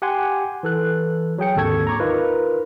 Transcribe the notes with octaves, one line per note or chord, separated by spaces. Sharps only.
G4 F#5 G#5 C6
E3 A4 F#6
F#3 G#4 G5 C#7
G#1 D#2 D3 A4 C#6 G#6
A#5 C#6 D6
D#4 F4 A#4 B4